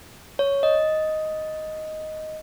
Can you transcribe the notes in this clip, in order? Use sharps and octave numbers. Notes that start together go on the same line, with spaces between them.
C#5
D#5